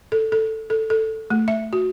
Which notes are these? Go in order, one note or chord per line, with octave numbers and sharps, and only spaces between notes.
A4
A4
A4
A4
A3
E5
F#4